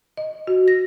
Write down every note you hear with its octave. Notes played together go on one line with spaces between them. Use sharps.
D#5
F#4
A#6